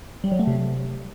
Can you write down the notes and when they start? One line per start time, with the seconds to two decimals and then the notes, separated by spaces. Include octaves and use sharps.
0.24 G3
0.32 F#3
0.39 A3
0.47 C3